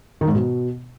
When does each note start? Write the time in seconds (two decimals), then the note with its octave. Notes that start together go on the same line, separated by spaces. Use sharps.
0.21 D#3
0.28 G#2
0.35 B2